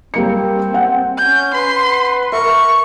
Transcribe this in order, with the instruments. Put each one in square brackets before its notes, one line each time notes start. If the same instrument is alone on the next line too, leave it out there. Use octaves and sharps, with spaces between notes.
[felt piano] G3 A#3 C#7 [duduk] C4
[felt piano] F#5
[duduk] C#4 [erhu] G6
[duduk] B4 [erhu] C6
[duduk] A#4 [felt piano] E5 [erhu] C#6